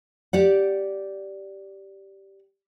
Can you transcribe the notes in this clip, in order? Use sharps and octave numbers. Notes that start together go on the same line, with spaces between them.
G4 D5 F#5